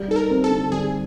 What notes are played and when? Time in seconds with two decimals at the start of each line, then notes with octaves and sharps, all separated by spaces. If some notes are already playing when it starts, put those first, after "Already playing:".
Already playing: G3
0.08 D#4 A4
0.16 A#4
0.30 C4
0.44 A4
0.50 D3
0.71 G3 G#4